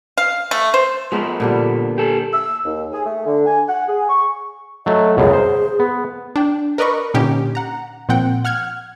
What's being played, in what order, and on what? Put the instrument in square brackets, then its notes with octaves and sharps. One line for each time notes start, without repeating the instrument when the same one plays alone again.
[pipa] F5
A3
C5
[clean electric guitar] F3 B3 [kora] G#3 A3 A#4
[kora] A#2 D3 G3
[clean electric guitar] G4 A4
[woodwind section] E6
D#2
G#4
A3
D3
G#5
F#5
G#4
C#6
[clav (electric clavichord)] F#3 A3 [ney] D#5
[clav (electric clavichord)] C#2 F#2 B2 [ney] G#4
[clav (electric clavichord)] C5
B3
[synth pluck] D4 G5
A#4 B4 D5 D#5 B5 C#6
A#2 D3 C#4 D#4 G4
F#5 A#5
A#2 F3 C4 F#5 G5
F#5 F6 F#6 G#6